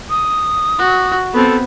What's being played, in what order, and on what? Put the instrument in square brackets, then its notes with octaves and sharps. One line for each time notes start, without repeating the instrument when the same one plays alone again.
[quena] D#6
[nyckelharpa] F#4
[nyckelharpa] B3 C4 [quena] A4